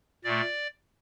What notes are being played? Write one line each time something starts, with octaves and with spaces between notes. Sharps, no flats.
A#2 A3 D5